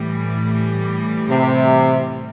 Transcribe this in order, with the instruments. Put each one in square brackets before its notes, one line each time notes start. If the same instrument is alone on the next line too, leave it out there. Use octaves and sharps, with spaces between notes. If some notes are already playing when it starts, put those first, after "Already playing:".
Already playing: [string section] A2 E3 G3
[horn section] C3